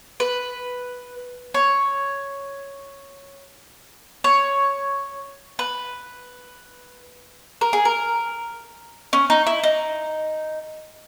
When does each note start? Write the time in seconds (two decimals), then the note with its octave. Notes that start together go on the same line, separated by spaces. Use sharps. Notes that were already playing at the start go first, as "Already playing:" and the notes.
0.20 B4
1.54 C#5
4.24 C#5
5.59 B4
7.61 A#4
7.73 G#4
7.85 A#4
9.13 C#4
9.30 D#4
9.47 E4
9.63 D#4